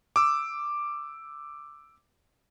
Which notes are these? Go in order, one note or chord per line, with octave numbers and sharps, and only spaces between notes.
D6 E6